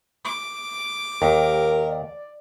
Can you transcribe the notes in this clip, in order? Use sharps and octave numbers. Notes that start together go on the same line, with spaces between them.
D6
D#2 G4 A#4
D5